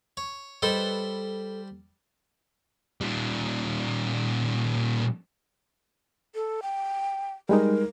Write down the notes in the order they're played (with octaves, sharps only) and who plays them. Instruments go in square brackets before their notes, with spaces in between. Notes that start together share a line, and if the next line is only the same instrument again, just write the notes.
[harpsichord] C#5
[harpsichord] G3 C5 B5 [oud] A4 B4 D#5
[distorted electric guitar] A#2 G3
[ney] A4
G5
[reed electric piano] G3 G#3 D#4 [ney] A#4